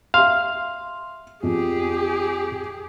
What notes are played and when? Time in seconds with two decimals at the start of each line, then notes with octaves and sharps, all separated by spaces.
0.14 E5 F5 C6
1.43 F2 G4 G#4